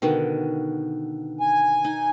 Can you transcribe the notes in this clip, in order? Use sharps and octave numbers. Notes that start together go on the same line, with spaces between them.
B2 D3 D#3
G#5
D#4